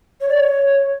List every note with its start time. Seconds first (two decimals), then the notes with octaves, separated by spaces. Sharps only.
0.21 C#5
0.29 D5
0.36 C#5